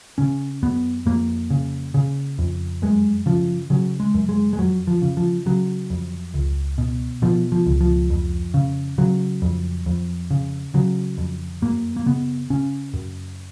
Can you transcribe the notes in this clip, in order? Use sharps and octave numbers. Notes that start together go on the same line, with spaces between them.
C#3 C#4
F#2 B3
F2 A#3
C#3
C#3
F2
F#2 G#3
C#3 F3
C#3 F#3
G#3
F#2
G#3
G#3
F2 F#3
F3
C#3
F3
C#3 F#3
F2
C#2
B2
B2 F3
F3
C#2
F3
F2
C#3
C#3 F#3
F2
F2
C#3
C#3 F#3
F2
F#2 A#3
A#3
C#3 B3
C#3 C#4
F#2